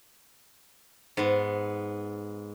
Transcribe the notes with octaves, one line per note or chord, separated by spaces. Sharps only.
G#2 B3